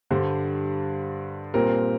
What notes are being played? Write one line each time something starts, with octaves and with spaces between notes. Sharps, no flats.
G2 D3 G3 C5
A#2 G3 C4 A#4